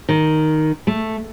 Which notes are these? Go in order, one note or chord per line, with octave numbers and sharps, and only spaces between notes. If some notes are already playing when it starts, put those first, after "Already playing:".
D#3
A3